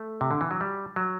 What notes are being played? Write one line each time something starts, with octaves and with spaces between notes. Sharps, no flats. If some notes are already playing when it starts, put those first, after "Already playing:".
Already playing: A3
C3
D3
E3
F#3
G3
F#3